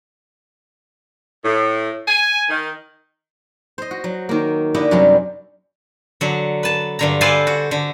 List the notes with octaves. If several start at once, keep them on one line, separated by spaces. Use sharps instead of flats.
A2
G#5
D#3
C5 D#5
F#4
F#3
D#3 A#3
D3 E4 G4 D#5 E5 F#5
F#2 C3 F#3 G3
D3 F#3
B4 A5
G2 D3 A#5
A4 B4 C5 D5 F5 G#5
F#4
D3